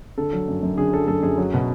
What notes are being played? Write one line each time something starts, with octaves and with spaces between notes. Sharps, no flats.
D3 A4
F#3
F#2
F#2
D3 G#4
F#3 A4
F#2 A4
F#2 G#4
F#3
B2